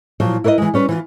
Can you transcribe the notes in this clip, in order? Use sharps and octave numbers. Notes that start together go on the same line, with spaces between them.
A#2 F3 F#3
E4 A#4 B4 C#5 D#5
E3 G#3
G3 C#4 B4
E3 F4